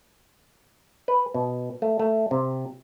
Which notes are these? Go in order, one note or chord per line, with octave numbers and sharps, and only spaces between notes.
B4
B2
A3
A3
C3